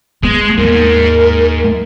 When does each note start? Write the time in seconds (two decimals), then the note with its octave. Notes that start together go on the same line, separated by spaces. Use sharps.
0.23 G#3 B3
0.57 D#2 G#2 A#4